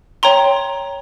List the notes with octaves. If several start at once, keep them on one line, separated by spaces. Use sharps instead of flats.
C#5 G5 A#5 C6